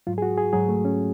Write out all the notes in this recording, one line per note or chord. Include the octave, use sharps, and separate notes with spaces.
G#2 F#3 F4
G#4
F#4
G#4
G#2 F#3 G#4
A3
C#4